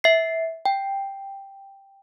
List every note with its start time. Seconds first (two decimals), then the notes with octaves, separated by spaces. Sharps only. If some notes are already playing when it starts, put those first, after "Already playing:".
0.04 E5 C7
0.66 G5